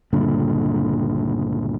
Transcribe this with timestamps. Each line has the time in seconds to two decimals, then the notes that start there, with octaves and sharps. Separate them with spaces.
0.13 C#2 G2 A#2 D3